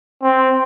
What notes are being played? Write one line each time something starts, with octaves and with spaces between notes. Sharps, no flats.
C4